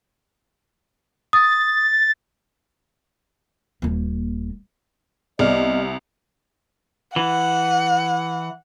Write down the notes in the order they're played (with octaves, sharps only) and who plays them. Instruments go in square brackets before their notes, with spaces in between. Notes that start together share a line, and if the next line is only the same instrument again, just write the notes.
[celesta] D#6 [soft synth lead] A6
[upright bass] D#1 A#3
[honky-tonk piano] C2 [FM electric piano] B3 D5 F6 [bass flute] D#5
[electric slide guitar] E3 [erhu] F#5